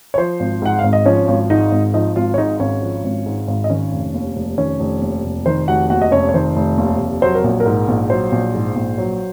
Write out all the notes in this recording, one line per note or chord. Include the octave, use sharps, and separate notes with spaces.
C#5
F3 C5
G#1
G#2 F#5
G#1 F5
D#5
F3 C#4 C#5
G#1
G#2 D#4 D#5
G#1
F3 D#4 D#5
G#1 F4 F5
C#5
G#2 D#4 D#5
G#1 C#4 C#5
F3
G#1
G#2
G#1
D#5
D#3 C#4 C#5
F1
D#2
F1
D#3 C#4 C#5
F1
D#2
F1
D#3 C5
F1 F#4 F#5
D#2 F#4 F#5
D#5
F1 C#4 C#5
C#5
D#3 C5
F1
D#2
F1
F#3 C5
A#4
A#1
A#4
G#2
A#1
F#3 C5
A#1
G#2
A#1
F#3